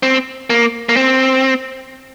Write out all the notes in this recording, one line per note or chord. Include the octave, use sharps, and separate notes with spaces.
C4
A#3
A#3
C4